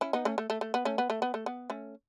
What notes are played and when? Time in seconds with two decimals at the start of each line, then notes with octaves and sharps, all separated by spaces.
0.01 C#4 E4
0.13 B3 D#4
0.25 A3 C#4
0.38 A3
0.50 A3
0.61 A3
0.74 B3
0.85 A3 C#4
0.98 B3
1.10 A3
1.22 B3
1.34 A3
1.46 B3
1.70 A3 C#4